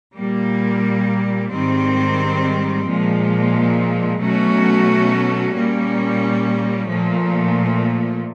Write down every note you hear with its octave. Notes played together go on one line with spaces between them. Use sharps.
A#2 G3 A#3
G#2 D#3 G3 C4
A#2 F3 G#3
B2 F#3 A3 C#4 F#4
A#2 G3 A#3 C#4
A#2 F3 A3